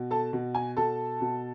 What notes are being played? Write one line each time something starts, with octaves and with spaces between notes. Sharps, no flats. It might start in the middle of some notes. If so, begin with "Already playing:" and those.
Already playing: B2
A4 A5
B2
G#5
B2 A4 A5
B2